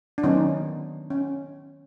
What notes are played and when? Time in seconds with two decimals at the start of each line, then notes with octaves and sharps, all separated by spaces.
0.18 D4
0.23 D#3 F#3 B3 C#4 D#4
1.10 C#4